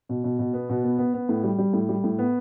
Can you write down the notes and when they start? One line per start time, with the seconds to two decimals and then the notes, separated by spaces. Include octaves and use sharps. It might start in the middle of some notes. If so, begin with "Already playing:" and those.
0.09 B2
0.24 B2
0.39 B2
0.53 B3
0.69 B2
0.84 B3
0.98 B3
1.14 B3
1.29 A2
1.44 G3
1.58 G3
1.73 A2
1.89 G3
2.04 A2
2.19 B3